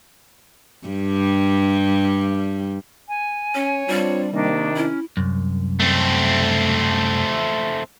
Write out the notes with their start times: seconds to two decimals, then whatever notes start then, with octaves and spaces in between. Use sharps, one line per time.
0.87 G2 G3
3.08 G#5
3.55 C#4 C#5
3.88 G3 C4 D4 F4
4.33 C3 D#3 A#3 D4
4.76 C#4 E4
5.17 C2 F#2
5.80 A3 C4